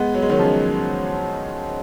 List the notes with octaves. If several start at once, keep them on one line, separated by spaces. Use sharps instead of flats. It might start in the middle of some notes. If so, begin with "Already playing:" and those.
Already playing: G#3 B3
F#3
G#3
D#3 F#3
C#3 F3